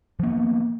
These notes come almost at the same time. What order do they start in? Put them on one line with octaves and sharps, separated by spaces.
F3 A#3 B3